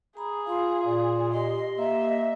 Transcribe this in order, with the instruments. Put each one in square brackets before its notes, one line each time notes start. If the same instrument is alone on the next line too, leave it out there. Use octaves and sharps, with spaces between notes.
[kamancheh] G#4 [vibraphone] A#5 B5
[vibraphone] F4 C6 [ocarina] F5
[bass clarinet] A#2 [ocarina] D5
[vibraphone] G4 [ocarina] D#5 [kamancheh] C6
[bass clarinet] A#3 [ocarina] D#5 [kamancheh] E5